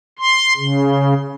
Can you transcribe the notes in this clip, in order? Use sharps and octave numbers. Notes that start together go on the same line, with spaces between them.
C6
C#3